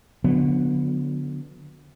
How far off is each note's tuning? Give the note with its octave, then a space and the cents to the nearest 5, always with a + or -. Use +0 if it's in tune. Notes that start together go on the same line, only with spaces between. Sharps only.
D3 +0 F#3 -35 B3 +0